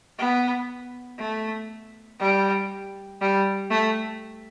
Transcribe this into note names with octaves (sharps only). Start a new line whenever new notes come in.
B3
A3
G3
G3
A3